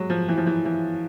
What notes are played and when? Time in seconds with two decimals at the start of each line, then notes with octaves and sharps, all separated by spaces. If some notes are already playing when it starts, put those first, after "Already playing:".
Already playing: F#3 G#3
0.10 F3
0.28 E3
0.37 F3
0.47 E3
0.65 E3